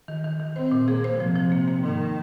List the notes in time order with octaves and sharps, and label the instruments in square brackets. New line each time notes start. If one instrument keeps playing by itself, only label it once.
[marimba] D#3
D#3
D#3
[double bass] C4 [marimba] C5
[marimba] A#2
[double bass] A#3 [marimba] G#4
[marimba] C5
[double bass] C3 [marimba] F3
[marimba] F3
A#3
A#3
[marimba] G#2 [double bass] D#3